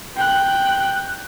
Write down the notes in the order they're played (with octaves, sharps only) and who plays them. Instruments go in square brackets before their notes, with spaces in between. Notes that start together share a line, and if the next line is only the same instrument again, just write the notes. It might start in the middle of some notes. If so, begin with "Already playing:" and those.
[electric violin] G5 F#6